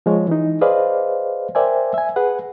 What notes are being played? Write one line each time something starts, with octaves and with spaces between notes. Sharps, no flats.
F3 G#3 C#5
E3 D#4
G#4 B4 C5 D5 D#5 F5
A#4 C5 D5 E5 G5 G#5
E5 G#5
G#4 B4 F#5